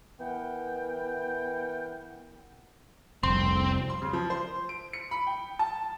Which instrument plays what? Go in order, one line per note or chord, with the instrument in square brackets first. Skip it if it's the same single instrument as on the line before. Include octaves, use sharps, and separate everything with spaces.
[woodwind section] E3 B3 A#4 F#5 G5
[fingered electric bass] F1 C2 [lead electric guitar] C4 [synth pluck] C6
[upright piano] C6
C#3
F3
C5
D7
C#7
B5
G5
A5